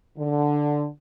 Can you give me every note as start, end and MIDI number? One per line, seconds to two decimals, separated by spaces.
0.18 0.87 50